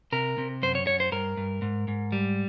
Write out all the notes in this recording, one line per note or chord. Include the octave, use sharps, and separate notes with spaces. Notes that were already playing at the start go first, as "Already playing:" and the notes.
C3 A#4
C3
F#2 C5
C#5
F#2 C#5
C5
G2 A#4
G2
G#2
G#2
G3